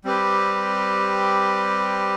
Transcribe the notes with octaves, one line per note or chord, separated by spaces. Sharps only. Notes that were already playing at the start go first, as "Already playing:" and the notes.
G3 C4 G4 B4